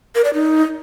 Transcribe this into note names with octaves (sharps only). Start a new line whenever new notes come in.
A#4
D5
D#4